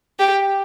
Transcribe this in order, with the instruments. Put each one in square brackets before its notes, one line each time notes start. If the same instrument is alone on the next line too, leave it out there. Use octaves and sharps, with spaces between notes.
[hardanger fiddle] G4